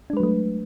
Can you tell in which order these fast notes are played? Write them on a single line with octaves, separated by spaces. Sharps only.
D4 G#3 B4 F#3 A3